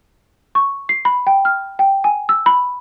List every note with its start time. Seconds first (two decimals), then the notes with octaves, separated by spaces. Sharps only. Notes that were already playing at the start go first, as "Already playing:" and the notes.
0.55 C#6
0.89 C7
1.05 B5
1.27 G5
1.45 F6
1.79 G5
2.04 G#5
2.29 E6
2.46 B5